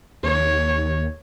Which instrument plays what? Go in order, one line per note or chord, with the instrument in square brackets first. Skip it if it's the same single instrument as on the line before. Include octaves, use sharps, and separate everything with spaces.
[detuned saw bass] D#2 [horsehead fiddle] C#5